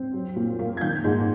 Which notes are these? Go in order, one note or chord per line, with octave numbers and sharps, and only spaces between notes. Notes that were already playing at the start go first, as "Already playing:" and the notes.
Already playing: C4
F#3
A#2
A#3
G#6
D#3 G6
G#2